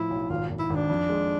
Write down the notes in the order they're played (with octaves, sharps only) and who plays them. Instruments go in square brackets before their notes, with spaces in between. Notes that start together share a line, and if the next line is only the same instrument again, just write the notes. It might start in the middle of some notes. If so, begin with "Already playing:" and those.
Already playing: [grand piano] A2 F3 [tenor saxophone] E4
[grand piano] B1
[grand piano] G#1 [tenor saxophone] F4
[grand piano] G#1
[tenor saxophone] E4
[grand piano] G#1
[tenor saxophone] D4
[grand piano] F2
G#3